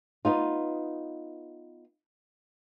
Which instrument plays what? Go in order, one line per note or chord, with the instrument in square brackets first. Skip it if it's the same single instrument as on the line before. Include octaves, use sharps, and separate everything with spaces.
[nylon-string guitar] B3 D#4 F4